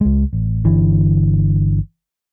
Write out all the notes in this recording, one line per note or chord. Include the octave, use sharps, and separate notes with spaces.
C#2 G#3
A1
G1 D3 E3